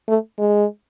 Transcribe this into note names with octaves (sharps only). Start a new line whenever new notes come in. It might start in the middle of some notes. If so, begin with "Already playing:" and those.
A3
G#3